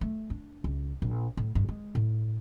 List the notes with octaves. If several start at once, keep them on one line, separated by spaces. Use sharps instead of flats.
A3
D4
C#2
A#1
A2
G2
G#3
A2